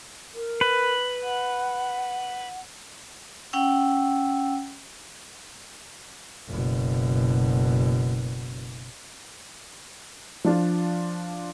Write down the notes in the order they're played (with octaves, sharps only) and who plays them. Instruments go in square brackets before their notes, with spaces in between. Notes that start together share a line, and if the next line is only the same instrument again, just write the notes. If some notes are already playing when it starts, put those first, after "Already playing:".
[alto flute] A#4
[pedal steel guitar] B4
[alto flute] F#5
[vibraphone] C#4 F#5 G5 E6
[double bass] F#1 B2
[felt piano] F3 D4 F4